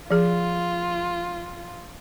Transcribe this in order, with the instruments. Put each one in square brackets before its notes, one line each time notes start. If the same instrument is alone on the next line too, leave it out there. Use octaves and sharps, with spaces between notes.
[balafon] F3 G#4 [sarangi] F4